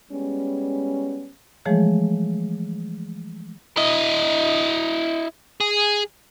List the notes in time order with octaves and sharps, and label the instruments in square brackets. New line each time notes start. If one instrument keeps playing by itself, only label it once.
[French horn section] G3 G#3 B3 C#4
[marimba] E3 F3 G#3 A3 G#4 C#5
[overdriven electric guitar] E4 D#5
G#4